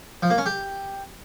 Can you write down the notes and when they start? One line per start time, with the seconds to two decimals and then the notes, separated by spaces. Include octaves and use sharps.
0.22 F3
0.30 A#3
0.38 C#4
0.46 G4